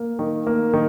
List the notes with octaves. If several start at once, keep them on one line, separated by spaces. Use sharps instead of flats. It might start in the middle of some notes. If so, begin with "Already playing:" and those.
Already playing: A#3
D#3
A#3
D#3